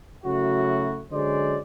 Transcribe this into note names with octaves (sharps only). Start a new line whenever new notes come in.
C#3 F#3 A3 E4 F#4
D3 F#3 G#3 C#4 C5 D5